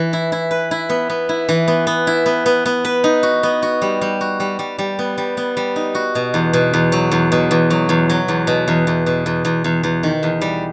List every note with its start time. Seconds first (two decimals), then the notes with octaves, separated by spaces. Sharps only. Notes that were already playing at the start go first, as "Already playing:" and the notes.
Already playing: E3
0.13 E4
0.32 E4
0.51 B4
0.71 E4
0.90 B3
1.10 B3
1.29 E4
1.49 E3
1.68 B3
1.87 B3
2.07 E4
2.26 B3
2.46 B3
2.66 B3
2.85 B4
3.04 D#4
3.23 F#4
3.43 B3
3.62 F#4
3.82 G3
4.01 G3
4.21 F#4
4.40 G3
4.59 G3
4.79 G3
4.99 B3
5.18 G3
5.37 B3
5.57 G3
5.76 D#4
5.95 F#4
6.15 B2
6.34 E2
6.53 B2
6.74 E2
6.92 F#3
7.11 E2
7.32 B2
7.51 E2
7.70 F#3
7.89 E2
8.10 F#3
8.28 E2
8.47 B2
8.68 E2
8.87 E2
9.06 B2
9.26 E2
9.45 E2
9.64 E2
9.83 E2
10.03 D#3
10.23 E2
10.41 G3